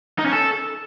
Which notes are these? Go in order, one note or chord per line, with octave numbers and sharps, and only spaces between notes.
D#4
C#4
A4